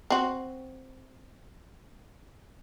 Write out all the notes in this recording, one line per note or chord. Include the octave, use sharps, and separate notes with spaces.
C4 F#4